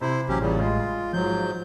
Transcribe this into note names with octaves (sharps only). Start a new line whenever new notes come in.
C3 E4 C5
A1 F#3 C#4 G4
E2 A#2 C#3 G3
G#3 F4
G#2 F3 F#3 G6